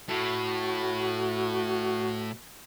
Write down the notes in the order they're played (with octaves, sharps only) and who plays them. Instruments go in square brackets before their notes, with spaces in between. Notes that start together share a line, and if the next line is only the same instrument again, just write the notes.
[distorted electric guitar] A2 [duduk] F#4